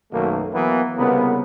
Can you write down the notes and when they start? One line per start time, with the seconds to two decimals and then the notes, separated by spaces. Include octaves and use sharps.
0.12 B1 F#2 B2 D#3 A3 A#3
0.54 E3 F#3 A#3 B3
0.97 C2 C#3 A#3 B3